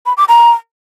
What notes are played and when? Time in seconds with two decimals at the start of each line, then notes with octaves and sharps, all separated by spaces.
0.06 B5
0.17 D6
0.28 A#5